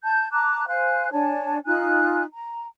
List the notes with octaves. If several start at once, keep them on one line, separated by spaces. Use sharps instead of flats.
A5 G6
A5 A#5 D6 F#6
C5 F5 G#5 F#6
D4 C#5 G#5 A5
D#4 F4 G#5 F#6
A#5